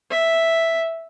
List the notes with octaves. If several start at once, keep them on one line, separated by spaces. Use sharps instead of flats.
E5